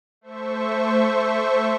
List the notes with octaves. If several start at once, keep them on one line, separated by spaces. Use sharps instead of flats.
A3 C5 E5 C#6